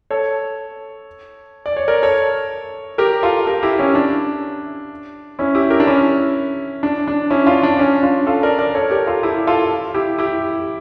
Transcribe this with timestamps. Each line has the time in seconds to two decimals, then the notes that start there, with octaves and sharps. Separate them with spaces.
0.11 A4 C#5
1.66 D5
1.77 C#5
1.88 A#4 D5
2.03 A4 C#5
2.98 G4 A#4
3.23 F4 A4
3.47 G4 A#4
3.63 E4 G4
3.79 C#4 E4
3.95 D4
5.39 C#4 E4
5.55 E4 G4
5.70 G4 A#4
5.80 D4
5.87 C#4 E4
6.83 D4
7.07 D4
7.30 C#4 E4
7.47 D4 F4
7.63 D4
7.79 C#4
8.03 D4 F4
8.26 F4 A4
8.43 A#4 D5
8.59 A#4 D5
8.75 A4 C#5
8.91 G4 A#4
9.07 F4 A4
9.23 E4 G4
9.47 F4 A4
9.94 E4 G4
10.18 E4 G4